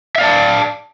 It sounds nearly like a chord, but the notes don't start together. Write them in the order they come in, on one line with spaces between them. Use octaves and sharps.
E5 F5 D5 A5